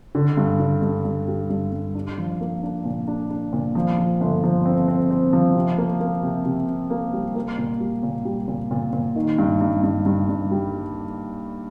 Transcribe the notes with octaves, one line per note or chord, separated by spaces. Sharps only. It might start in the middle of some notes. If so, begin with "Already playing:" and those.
D3
G2
D3
G2
G2
G3
G2
G2
D4
F3
A#3
D4
A#2
D4
D4
A#2
F3
F3
G1
F3
C4
C4
C4
F3
C3
A#3
A#3
C3
C3
C3
A#3
G3
A#3
A#2
G3
A#2
G3
A#2
A#2
A#2
D#3
G2
G2
G2
G2
G2
G3